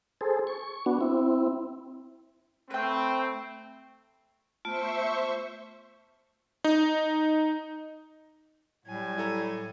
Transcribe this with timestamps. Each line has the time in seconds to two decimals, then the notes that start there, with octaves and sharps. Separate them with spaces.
0.21 G#4 A4 C5
0.47 C#6
0.86 B3 D4 F#4
1.01 C4 E4
2.71 A3 C4 B4 G5
4.65 A3 B3 F4 C5 E5 C#6
6.64 D#4
8.86 A2 F#3 G3 G#5
9.18 E4 A4 A#5